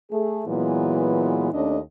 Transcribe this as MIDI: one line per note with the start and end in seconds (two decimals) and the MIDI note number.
0.12 0.42 57
0.12 0.42 68
0.46 1.52 46
0.46 1.52 52
0.46 1.52 54
0.46 1.52 56
0.46 1.52 59
1.53 1.78 39
1.53 1.78 57
1.53 1.78 61
1.53 1.78 62
1.53 1.78 75